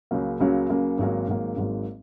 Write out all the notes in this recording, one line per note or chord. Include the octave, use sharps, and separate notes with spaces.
C#2 C#3 F#3 A#3
C#2 C#3 F#3 A#3
C#2 C#3 F#3 A#3
G#1 G#2 F#3 A#3
G#1 G#2 F#3 A#3
G#1 G#2 F#3 A#3